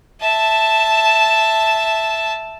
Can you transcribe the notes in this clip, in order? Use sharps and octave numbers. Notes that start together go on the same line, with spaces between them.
E5 A5